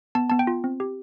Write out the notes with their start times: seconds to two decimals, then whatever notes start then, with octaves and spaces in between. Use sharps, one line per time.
0.15 B3 A5
0.30 B3 A5
0.39 G5
0.47 F4
0.64 C4
0.80 G4